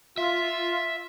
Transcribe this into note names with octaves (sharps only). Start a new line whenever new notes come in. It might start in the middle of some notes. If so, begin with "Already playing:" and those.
F4 E5